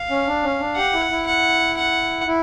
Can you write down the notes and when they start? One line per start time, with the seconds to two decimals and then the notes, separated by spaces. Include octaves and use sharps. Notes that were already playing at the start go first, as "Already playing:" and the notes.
Already playing: F5
0.10 C#4
0.27 D4
0.43 C#4
0.60 D4
0.76 G4 F#5
0.93 E4
1.11 E4
1.27 F#5
1.77 F#5
2.27 E4